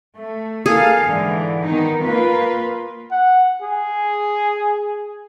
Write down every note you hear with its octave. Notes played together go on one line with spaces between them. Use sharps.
A3
A#3 G#4 A4 F5
G#2 D3 E3
D#3 B3 D#4
A#3 F4 B4
F#5
G#4